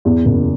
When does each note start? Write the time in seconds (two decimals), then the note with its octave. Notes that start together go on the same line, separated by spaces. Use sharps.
0.05 E2
0.26 F#1